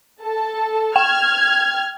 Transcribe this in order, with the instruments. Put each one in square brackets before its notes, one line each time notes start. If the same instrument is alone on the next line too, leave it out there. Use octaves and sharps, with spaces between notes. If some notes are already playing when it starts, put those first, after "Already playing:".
[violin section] A4 A5
[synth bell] G5 [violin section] F6 G#6